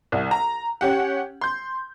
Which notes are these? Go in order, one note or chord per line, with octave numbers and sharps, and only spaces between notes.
C2
A#5
C#4 G4 F#5
C6 G6